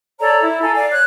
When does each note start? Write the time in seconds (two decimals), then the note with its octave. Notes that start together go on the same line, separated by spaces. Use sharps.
0.19 A4 C#5 D5 A#5
0.42 E4
0.62 A4 F5 G#5 A#5
0.76 D5 F5
0.91 C#5 F#6